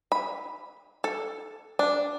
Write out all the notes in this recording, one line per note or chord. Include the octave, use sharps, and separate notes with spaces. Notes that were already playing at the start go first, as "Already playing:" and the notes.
B5
A4
D4